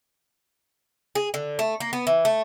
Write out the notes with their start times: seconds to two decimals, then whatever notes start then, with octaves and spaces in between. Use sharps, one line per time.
1.15 G#4
1.34 D3
1.59 A3
1.80 A#3
1.93 B3
2.07 E3
2.25 A3